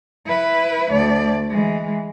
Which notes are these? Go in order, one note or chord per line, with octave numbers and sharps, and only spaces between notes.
E4 B4
D2 D5
E3 G#3